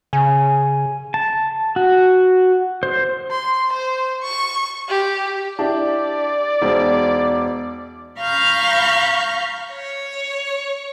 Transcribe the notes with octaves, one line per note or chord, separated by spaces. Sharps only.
C#3 G#5
A5
F#4
C5
C6
C5
C#6
G4
D4 E4 G4 D5
E1 D#4 C5
F5 A#5 B5 C#6 F6 G6
C#5